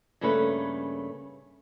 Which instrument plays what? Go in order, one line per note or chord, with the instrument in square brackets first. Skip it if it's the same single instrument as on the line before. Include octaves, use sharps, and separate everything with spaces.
[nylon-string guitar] G2 C#3 A3 A#3 C#4 B4